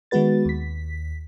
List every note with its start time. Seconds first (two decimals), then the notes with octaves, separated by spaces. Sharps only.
0.11 D#3 G#3 B3 F#4 B4 A6
0.46 D#2 B6